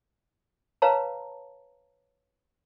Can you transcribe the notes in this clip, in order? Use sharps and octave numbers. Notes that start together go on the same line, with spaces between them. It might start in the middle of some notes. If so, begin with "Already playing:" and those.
B4 C#5 F5 A5 A#5